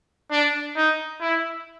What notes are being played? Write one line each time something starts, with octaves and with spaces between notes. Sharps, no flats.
D4
D#4
E4